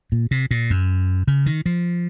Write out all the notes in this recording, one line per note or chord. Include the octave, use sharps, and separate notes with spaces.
A#2
C3
A#2
F#2
C#3
D#3
F3